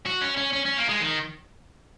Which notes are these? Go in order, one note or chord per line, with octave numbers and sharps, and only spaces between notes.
F#4
C#4
C#4
C#4
C#4
A#3
G#3
D#3